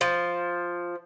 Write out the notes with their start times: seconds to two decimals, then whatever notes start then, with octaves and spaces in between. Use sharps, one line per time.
0.01 F3